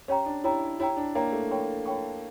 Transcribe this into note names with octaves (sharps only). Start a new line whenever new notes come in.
C#4 G4 C#5 G5 A#5
D4
E4 G4 C#5 G5 A#5
E4 G4 C#5 G5 A#5
D4
A#3 G4 C#5 G5 A#5
A3
F4 C#5 G5 C#6
F4 C#5 G5 C#6